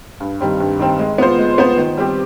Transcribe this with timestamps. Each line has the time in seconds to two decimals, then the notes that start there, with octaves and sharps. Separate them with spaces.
0.20 G2
0.41 D#3 G3 C4
0.60 G2
0.79 D#3 G3 C4
0.99 G#3
1.18 B3 F4 C5
1.39 G#3
1.58 B3 F4 C5
1.77 D#3
1.98 G3 C4 G4